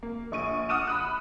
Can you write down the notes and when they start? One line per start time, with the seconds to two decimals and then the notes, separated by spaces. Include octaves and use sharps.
0.03 A#3
0.32 A#1 C#6 D#7
0.69 F#5 D6 D#6 F6 D#7 E7
0.87 B5 D#6 F#6